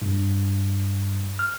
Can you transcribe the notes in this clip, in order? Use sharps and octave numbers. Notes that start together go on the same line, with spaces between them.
G2
F6